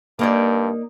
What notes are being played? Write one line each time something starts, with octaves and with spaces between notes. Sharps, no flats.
G2 A#3 D#4 D5